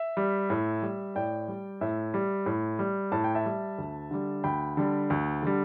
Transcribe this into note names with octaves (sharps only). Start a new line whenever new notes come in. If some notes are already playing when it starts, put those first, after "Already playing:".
Already playing: E5
G3
A2
G3
A2 D5 G5
G3
A2 E5
G3
A2
G3
A2 A5
G5
E5 A5
G3
D2
D3 G3
D2 G5 B5
D3 G3
D2
D3 G3